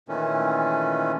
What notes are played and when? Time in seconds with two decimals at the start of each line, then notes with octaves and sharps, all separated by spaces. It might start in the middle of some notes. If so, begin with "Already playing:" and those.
0.08 A#2 D#3 E3 A3 C#4